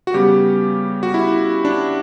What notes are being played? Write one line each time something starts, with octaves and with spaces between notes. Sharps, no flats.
F#4
C#3 G3 B3 G4
F#4
E4
D4